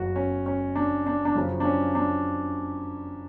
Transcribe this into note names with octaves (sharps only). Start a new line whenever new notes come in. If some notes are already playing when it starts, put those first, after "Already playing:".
Already playing: F#1 F#2 C#3 F#4
C#4
C#4
D4
D4
D4
F#2 C#3 F3 C#4
D4
C#4
D4